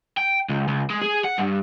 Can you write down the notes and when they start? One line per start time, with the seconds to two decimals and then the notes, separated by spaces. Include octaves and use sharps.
0.17 G5
0.49 C#2
0.68 C#2
0.90 G#3
1.01 G#4
1.24 F#5
1.38 G2